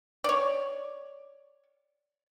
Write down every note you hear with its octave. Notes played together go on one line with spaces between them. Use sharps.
C#5 D5